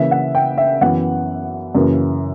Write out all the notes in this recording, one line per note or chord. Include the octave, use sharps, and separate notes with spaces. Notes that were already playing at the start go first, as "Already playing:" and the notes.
Already playing: C#3 E3 A#3 E5
F#5
G5
E5
F#2 E3 B3 F#5
F#2 C#3 E3 A#3